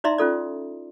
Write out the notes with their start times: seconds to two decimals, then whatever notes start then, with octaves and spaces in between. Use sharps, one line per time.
0.04 D#4 E4 D5 E5 A#5 C6
0.18 C#4 F4 A4 D5